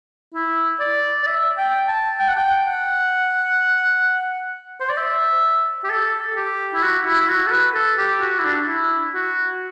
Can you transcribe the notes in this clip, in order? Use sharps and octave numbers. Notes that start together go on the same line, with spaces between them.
E4
D5
D5
E5
G5
A5
G5
F#5
G5
F#5
C5
D5
E5
G4
A4
G4
E4
F#4
E4
E4
F#4
A4
B4
A4
G4
F#4
E4
D4
E4
F#4